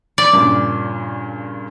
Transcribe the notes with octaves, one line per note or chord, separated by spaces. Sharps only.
D5
G2 A#2 C#3